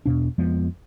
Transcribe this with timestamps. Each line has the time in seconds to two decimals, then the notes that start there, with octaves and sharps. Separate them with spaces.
0.06 E2 B2 D4
0.38 F2 F3 G#3 B3